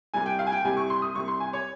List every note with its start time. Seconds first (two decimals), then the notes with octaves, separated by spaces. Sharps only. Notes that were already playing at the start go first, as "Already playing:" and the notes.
0.14 C2 C3 G3 G#5
0.26 G5
0.39 F5
0.47 G#5
0.52 G5
0.64 C2 C3 G3 G#5
0.77 C#6
0.90 C6
1.02 D#6
1.14 C2 C3 G3 C#6
1.28 C6
1.40 G#5
1.53 C#5